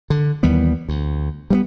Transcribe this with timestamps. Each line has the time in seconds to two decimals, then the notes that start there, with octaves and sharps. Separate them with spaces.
0.10 D3
0.43 D#2 E3 G3 B3
0.89 D2
1.50 G3 A#3 B3